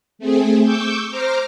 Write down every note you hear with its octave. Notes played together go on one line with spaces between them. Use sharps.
A3 C4 G#4
C#6 D6 E6 G6
C5 A#5 D6 F6